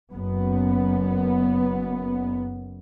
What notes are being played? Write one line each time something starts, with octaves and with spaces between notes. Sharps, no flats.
F#1 F#2 B3